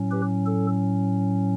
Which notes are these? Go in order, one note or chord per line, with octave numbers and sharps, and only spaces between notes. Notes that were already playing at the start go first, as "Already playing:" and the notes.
Already playing: A2 F#3 C#4
G4 B4
A4